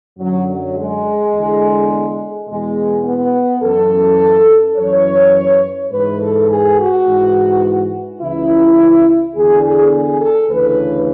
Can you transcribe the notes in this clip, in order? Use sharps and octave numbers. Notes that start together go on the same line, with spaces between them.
F#2 D3 F#3
F#3
G#3
E2 D3
E2 B2 G#3
B3
F#2 E3 A4
F#2 E3 C#5
G#2 E3 B4
A4
G#4
F#4
G#2 E3
C#2 C#3 E3 E4
E2 D3 G#4
G#4
G#4
A4
D2 C#3 E3 B4